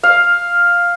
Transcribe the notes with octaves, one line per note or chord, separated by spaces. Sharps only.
F5